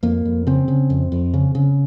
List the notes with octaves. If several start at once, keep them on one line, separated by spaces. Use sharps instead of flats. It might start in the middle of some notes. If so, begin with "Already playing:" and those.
F2 A#3
F2
C#3 C4
C#3
F2
F2
C#3
C#3